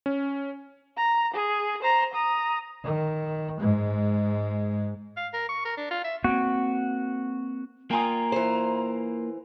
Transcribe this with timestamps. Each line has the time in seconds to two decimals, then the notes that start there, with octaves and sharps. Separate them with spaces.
0.06 C#4
0.97 A#5
1.34 G#4
1.83 C5 A#5
2.14 A#5 D#6
2.84 D#3
3.60 G#2 G#3
5.17 F5
5.34 A#4
5.49 C#6
5.65 A#4
5.77 D4
5.90 F4
6.04 E5
6.24 A#3 C4 F#4
7.91 A#3 F4 G5 G#5 A#5 D#6
8.32 E3 C5